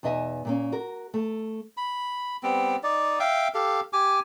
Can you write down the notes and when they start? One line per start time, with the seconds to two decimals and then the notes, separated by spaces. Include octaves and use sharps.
0.03 E2 B2 D#4 D#5 E5 G#5
0.45 A#2 A#3 C#4
0.72 F#4 A#4
1.14 A3
1.77 B5
2.43 G3 B3 C4
2.83 D#4 D5
3.20 E5 F5 G5
3.54 G4 A4 F5
3.93 G4 G#5 D6